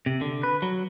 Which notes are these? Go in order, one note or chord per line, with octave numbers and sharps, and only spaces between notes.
C3
D3
B4
F#3